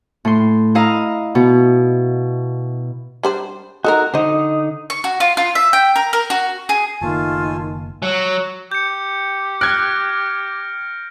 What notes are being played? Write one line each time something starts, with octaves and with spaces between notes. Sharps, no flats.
A2 C6
E4 D#5 F5 A#5
B2
G3 D4 C5
D#4 F#4 A4 A#4
D3 D#4 C5 D#5
C#6
F#4
F4
F4
E5
G5
A#4
A#4
F#4
G#4
F#1 D#3 A3 A#3 F4 G#5 A5
F#3
G4 G6 C#7
F6 F#6 G#6 A#6 D7